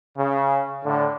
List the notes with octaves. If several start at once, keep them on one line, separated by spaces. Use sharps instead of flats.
C#3
A2 D3